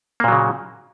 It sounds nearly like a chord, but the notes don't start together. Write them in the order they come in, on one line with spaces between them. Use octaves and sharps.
A#3 A#2 F#3 C#3